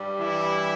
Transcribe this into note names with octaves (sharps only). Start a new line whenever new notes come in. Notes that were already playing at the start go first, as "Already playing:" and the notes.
Already playing: G2 G3
E3 E4